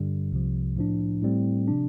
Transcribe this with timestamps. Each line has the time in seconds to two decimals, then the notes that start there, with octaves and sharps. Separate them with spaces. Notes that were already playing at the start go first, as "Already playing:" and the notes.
Already playing: G2 D3 G3
0.32 C2 C3 F3
0.77 A2 F3 D4
1.22 A2 G3 C4
1.68 C3 F3 D4